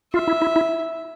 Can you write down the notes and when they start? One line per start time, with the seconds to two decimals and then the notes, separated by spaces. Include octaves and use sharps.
0.13 F4 E5
0.28 E4
0.42 E4
0.56 E4